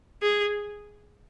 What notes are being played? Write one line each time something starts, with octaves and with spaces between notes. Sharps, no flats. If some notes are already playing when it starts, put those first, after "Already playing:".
G#4